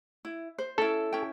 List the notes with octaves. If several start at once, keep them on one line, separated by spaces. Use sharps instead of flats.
E4
C5
C#4 E4 A4
C#4 E4 G5